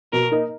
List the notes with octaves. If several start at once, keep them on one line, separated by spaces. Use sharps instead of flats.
B2 A#4
A#3 D#4 A#4 D#5